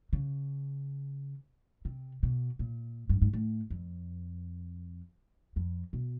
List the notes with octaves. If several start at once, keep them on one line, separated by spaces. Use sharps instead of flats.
C#3
C3
B2
A#2
G2
G#2
A2
F2
F2
B2